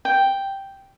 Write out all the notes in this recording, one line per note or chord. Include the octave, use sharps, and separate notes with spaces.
G5